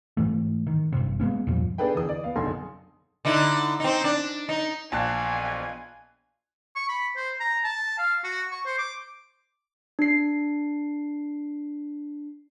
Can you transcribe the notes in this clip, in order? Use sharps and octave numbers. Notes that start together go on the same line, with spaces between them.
G#2 E3 A3
D#3
G#1 G2 C3
G#3 A#3 B3 C#4
E2 G2 A#2 F3
B3 D4 G#4 A4 B4 G5
D3 E3 D#6
D5
B3 F5
F#1 B1 D3 A4 G#5 C6
D3 D#4 E4
C4 D#4
D4
D#4
A#1 E2 F5 G#5 A5 F#6
C#6
B5
C5
A#5
A5
F5
F#4
C#6
C5
D6
D4 C7